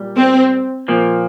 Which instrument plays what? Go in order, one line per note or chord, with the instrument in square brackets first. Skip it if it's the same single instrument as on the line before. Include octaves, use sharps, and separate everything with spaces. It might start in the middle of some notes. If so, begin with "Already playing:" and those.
Already playing: [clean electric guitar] A#2 G3
[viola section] C4
[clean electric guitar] A#2 F3 A#3